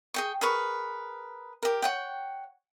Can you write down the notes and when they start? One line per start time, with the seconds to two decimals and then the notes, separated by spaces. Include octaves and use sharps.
0.14 G#4 G5 C#6
0.41 G#4 A#4 B4 C#6
1.63 G4 A#4
1.82 C#5 F#5 G5